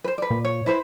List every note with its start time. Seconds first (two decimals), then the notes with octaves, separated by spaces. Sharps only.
0.04 B4 C5
0.18 B4 D5
0.31 A#2
0.45 C#5
0.66 E4 B4 C5